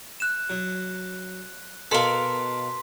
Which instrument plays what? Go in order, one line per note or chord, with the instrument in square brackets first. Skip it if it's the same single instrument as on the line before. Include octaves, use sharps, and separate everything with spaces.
[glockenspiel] F#6 E7
[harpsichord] F#3
[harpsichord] B2 F5 D6 [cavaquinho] A4 A#4 [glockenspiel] C6 B6